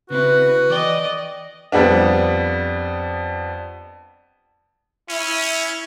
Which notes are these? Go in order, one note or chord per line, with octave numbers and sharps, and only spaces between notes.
C#3 C4 E4 F#4 B4
E3 D5 D#5 G5
F2 G3 B3 D4
C#4 E4